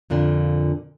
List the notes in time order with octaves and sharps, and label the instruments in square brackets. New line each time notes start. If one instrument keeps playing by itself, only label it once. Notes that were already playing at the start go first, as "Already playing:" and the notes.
[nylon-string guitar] F2 A#2 D3 D4